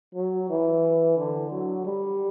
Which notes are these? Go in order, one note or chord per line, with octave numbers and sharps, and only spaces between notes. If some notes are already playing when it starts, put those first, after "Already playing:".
F#3
E3
D3
F#3
G3